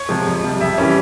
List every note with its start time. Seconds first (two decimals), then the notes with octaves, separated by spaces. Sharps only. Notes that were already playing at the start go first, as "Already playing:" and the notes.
Already playing: C#5
0.09 C3 F3 G#3
0.27 F2
0.43 C3 G3
0.60 F2 E5
0.78 E3 G3 C#4